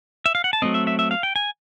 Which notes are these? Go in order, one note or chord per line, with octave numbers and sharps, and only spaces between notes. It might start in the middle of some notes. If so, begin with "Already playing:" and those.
E5
F5
F#5
A5
F#3 A3 C4 D#5
E5
E5
E5
F5
G5
G#5